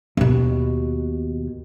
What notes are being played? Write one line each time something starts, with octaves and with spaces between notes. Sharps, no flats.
D#2 B2